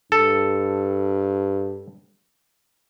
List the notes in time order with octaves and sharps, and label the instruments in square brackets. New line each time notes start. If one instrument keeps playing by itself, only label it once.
[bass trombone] G2 [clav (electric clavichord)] A4